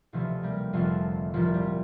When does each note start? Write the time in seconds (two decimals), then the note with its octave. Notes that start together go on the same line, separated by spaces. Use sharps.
0.13 E1 D2 C3 E3 F3 A3
0.43 G3 A#3
0.73 F1 F2 D3 F3 A3
1.34 C2 A#2 F3
1.54 G3